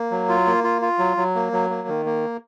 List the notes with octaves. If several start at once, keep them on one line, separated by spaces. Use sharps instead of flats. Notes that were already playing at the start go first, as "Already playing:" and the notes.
Already playing: A#3
F#3
F4
A#3
F4
F4
F#3
F#3
A#3
F#3
A#3
D#3
A#3